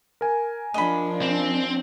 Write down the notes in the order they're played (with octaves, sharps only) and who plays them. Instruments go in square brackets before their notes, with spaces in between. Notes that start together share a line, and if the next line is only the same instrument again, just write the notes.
[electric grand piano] A#4 G#5
[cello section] F3 D4 [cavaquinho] D#5 B5
[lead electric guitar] C4